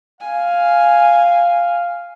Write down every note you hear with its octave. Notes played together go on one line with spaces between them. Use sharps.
F5 G#5